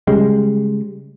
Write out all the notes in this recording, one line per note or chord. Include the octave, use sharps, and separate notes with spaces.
C#3 G3 G#3